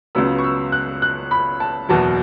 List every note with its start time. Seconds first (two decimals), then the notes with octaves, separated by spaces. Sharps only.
0.15 C#2 C#3 F#3 B3 E6
0.38 C#6
0.44 E6
0.72 F#6
1.02 F#6
1.31 B5
1.60 A5
1.89 F#1 E2 B2 F#3 A5